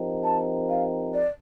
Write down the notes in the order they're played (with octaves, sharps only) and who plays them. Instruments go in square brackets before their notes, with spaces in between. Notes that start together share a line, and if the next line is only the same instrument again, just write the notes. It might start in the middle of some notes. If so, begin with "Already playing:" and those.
Already playing: [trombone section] F3 C4 D#4 G4 A#4
[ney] A5
F5
D5